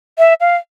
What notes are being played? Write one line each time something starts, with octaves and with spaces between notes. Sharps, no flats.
E5
F5